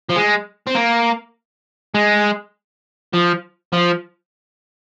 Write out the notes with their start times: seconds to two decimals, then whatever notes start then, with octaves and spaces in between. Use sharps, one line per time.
0.10 F3
0.16 G#3
0.67 C4
0.75 A#3
1.94 G#3
3.14 F3
3.73 F3